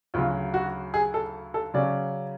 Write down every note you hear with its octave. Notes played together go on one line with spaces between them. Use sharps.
D2 C#3 F#3 F4
F#4
G#4
A4
A4
C#3 F#3 C#4 D5